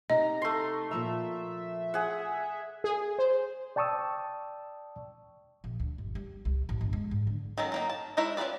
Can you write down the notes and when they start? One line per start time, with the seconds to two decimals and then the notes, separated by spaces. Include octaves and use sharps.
0.10 C3 D#4 D#5 A#5
0.42 A3 C6
0.91 A#2 F3 E5 A#5
1.94 G#4 F#5
2.84 G#4
3.19 C5
3.76 D5 G5 A5 C#6 D#6 E6
5.64 A#1
5.80 D2
5.98 G1
6.15 G3
6.45 C2
6.69 A1
6.81 G1
6.93 G#3
7.11 G#2
7.27 D3
7.58 D#3 F#3 C#4 A4
7.72 F#3 A#3 D#4
7.90 A5
8.17 G#3 D#4 E4 C#5 E5
8.37 C#4 F4 A4 B4 D5